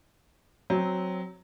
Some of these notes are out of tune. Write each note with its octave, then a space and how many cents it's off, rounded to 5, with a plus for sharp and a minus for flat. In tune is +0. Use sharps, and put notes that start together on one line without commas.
F#3 +0 C4 +0